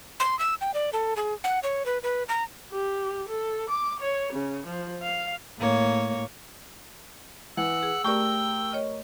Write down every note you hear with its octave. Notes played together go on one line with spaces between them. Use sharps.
C6
E6
G5
D5
A4
G#4
F#5
C#5
B4
B4
A#5
G4
A4
D6
C#5
C#3
F3
F5
A2 A#3 C#5
E3 F#5 E6
G#4
A3 G4 A#4 D5 G5 C#6
C#5 D#5 F6